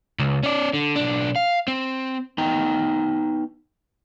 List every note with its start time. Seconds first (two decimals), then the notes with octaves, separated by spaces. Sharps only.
0.19 C#2
0.43 C#4 D5
0.73 D3
0.96 B1 D4
1.36 F5
1.68 C4
2.38 B3 D#4 G5 A#5